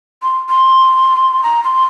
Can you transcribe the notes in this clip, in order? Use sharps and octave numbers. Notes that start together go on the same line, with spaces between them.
C6
C6
A#5
C6